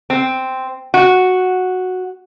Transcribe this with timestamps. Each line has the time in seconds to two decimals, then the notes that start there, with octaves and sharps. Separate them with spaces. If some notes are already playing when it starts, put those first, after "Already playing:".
0.10 C4
0.94 F#4